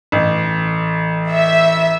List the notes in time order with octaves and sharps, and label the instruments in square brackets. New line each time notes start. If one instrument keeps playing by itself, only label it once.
[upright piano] A1
[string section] E5